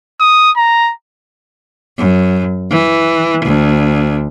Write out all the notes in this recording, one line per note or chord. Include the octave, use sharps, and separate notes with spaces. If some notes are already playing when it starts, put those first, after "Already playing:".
D#6
A#5
F#2
E3
D2